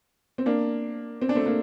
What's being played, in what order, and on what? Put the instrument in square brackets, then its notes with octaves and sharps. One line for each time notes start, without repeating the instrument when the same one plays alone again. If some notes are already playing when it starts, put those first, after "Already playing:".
[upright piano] C4
A#3 D4
C4
D4
A3 C4
A#3 D4